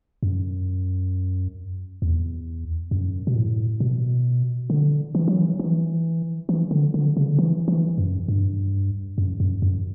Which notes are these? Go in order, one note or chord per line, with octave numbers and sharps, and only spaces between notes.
F#2
E2
F#2
B2
A2
B2
D3
E3
F#3
E3
E3
E3
D3
D3
C#3
D3
E3
E3
F#2
G2
F#2
F#2
F#2